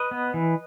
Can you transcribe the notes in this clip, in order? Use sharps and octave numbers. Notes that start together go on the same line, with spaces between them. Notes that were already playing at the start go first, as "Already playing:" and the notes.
Already playing: B4 D#5
B3
E3